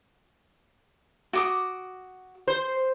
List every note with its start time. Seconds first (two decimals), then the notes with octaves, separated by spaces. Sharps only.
1.33 F#4 D6 D#6
2.48 C5